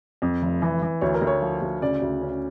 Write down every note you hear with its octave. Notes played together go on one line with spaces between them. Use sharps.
F2
F1
E3
E3
D2 C#5
A#4
D2
C#5
F3
D2
C#3 D5
D2
C#4